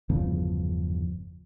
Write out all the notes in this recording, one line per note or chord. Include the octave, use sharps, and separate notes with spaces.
G1 E2 C#3 F3